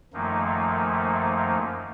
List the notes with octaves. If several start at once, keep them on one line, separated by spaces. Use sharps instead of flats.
F#2 D#3 F3 A3 A#3 D#4